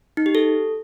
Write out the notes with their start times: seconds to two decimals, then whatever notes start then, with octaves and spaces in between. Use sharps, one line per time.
0.17 D#4
0.26 G4
0.35 A4